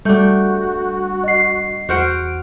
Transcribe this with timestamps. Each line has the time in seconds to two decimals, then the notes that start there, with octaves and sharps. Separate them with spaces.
0.05 G3 A3 D4 F#4 A4 G6
1.24 D#5 C7
1.89 E2 F#4 C5 F#5 F6 D7